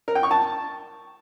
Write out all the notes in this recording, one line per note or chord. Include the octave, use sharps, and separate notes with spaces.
A#4
G5
C#6
A5